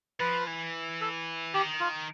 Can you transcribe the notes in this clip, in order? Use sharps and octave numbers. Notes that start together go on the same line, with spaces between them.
F3 B4
E3
A4
D#3 G4
F4